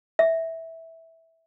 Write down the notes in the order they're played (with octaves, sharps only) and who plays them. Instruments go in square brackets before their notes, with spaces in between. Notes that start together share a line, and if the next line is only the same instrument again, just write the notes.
[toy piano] E5